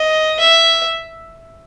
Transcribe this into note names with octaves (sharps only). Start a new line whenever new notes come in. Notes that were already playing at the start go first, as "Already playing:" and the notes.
Already playing: D#5
E5